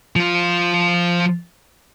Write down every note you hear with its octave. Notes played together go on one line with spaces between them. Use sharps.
F3 F4